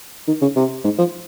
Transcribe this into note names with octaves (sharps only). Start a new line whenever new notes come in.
D#3
C#3
C3
G#2
F3